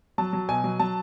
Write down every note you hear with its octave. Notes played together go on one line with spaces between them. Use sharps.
F#3 A5
F#3
B2 G#5
F#3
F#3 A5